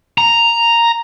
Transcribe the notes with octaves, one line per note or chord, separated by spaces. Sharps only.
A#5